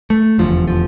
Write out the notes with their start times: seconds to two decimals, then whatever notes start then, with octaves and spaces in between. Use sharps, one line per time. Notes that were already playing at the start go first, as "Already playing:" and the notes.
0.10 A3
0.38 F1 E2 D3 F3
0.68 F3